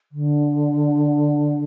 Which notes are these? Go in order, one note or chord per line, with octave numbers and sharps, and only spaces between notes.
D3